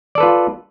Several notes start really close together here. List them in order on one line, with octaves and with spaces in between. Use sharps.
D5 A4 B4 F4